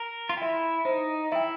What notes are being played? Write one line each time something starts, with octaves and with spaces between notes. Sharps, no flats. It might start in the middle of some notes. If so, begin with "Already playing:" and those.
Already playing: A#4
F4
E4 E5 G5
D#4 C5
E4 E5 G5